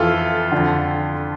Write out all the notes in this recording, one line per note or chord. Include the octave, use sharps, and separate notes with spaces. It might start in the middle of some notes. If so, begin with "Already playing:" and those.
Already playing: F2 E3 F4 A4
F2 D3